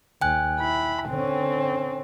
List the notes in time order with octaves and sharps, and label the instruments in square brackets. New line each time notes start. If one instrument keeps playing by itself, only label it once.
[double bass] D#2 [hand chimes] G5 G#5 F#6
[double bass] E4 [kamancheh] B5
[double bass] D3 C#4 [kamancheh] C4